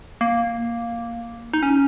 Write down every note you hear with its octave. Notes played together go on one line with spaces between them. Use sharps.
A#3
D#4
C#4